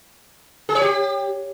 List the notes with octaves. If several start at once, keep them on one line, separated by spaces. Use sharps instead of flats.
G#4
C#5
G4